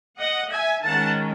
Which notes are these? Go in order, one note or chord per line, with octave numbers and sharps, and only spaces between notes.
D#5 F#5
E5 G#5
D#3 G#3 C#4 F#5 A5